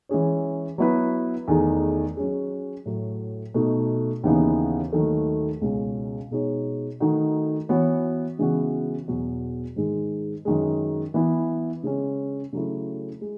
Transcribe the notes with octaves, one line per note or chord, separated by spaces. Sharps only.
E3 G#3 C#4 G#4 C#5
F#3 B3 E4 B4
E2 D#3 A3 D#4 G#4
F#3 C#4 G#4
A2 F#3 A3
B2 A3 D#4
D#2 C#3 E3 B3 D#4
D#2 D#3 F#3 A3
C#2 B2 G#3 C#4
B2 G#3 D#4 G#4 C#5
D#3 A3 D#4 F#4
E3 B3 F#4 C#5
C#3 E3 G#3 B3 F#4
E2 B2 F#3 B3 F#4
G#2 D#3 G#3
F#2 D#3 G#3
E3 B3 E4
C#3 G#3 C#4
C#3 F#3 A3 E4
G#3